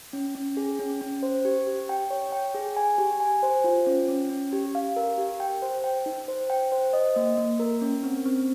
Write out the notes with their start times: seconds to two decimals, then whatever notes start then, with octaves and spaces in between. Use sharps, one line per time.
0.13 C#4
0.35 C#4
0.57 G#4
0.79 C#4
1.01 C#4
1.23 C5
1.45 G4
1.67 G4
1.89 G5
2.10 C#5
2.32 G5
2.55 G#4
2.77 G#5
2.98 G4
3.20 G#5
3.43 C5
3.64 F4
3.86 C#4
4.08 C#4
4.30 C#4
4.53 G4
4.75 F5
4.96 A#4
5.18 G4
5.40 G5
5.62 C5
5.84 G5
6.06 D#4
6.28 C5
6.50 G5
6.72 C5
6.93 D#5
7.16 A#3
7.38 A#3
7.59 A#4
7.82 C#4
8.03 C4
8.26 C4